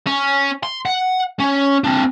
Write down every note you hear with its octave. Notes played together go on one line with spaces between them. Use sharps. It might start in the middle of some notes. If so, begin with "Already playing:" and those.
C#4
C6
F#5
C#4
C4 D4